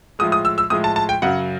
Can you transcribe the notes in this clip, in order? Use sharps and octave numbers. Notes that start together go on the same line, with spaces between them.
A2 F3 G#3 D#6
D#6
E6
E6
A2 F3 G#3 D#6
A5
A5
G5
F#2 C#3 F#3 F#5